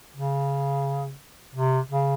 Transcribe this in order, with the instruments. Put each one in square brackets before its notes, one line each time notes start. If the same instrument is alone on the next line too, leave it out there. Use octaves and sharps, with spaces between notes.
[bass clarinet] C#3
C3
C#3